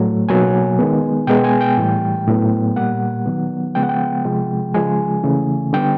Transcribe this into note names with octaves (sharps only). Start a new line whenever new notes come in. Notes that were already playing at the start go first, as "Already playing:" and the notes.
Already playing: A2 F#3 A3
B2 F#3 A#3 G#5
D#3 G#3 B3
B2 G#3 B3 G5
G#5
G5
A2 E3 G3
A2 F#3 B3
A#2 G3 A#3 F#5
D#3 F#3 B3
C#3 F3 G#3 B3 G5
F#5
G5
C3 F3 G#3
C#3 F3 G#3 G#5
C#3 E3 A3
D3 G3 B3 G5